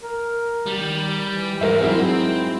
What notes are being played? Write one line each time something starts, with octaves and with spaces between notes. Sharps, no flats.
A#4
D#3 G3
E3
G#2 A#4 E5
F#3 G#3 C4 D#4 E4